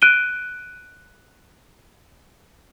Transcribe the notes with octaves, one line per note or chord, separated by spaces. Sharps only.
F#6 D7 D#7 G7